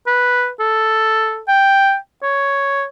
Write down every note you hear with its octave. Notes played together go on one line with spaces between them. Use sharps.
B4
A4
G5
C#5